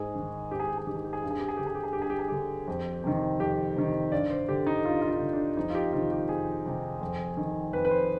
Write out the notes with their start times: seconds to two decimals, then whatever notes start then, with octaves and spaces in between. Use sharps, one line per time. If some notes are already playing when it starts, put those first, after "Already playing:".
Already playing: G#2 G#4
0.15 D#3
0.51 G#2 G4
0.60 G#4
0.68 G4
0.78 G#4
0.86 D#3 G4
0.96 G#4
1.05 G4
1.13 G#4
1.22 G2 G4
1.31 G#4
1.39 G4
1.49 G#4
1.57 D3 G4
1.67 G#4
1.75 G4
1.84 G#4
1.93 G2 G4
2.02 G#4
2.10 G4
2.19 G#4
2.28 D3 G4
2.67 F2
3.04 C3 D#3
3.40 F2 G4
3.76 C3 D#3
4.12 G2 D5
4.30 C5
4.49 D3 G4
4.67 D#4
4.84 G2 F4
5.02 F4
5.09 D#4
5.21 D3
5.33 D4
5.57 F2 D#4
5.70 F4
5.75 G4
5.93 C3 D#3 F4
6.12 G4
6.29 F2 G#4
6.66 C3 D#3
7.01 F2
7.37 D#3
7.73 F2 B4
7.85 B4
7.91 C5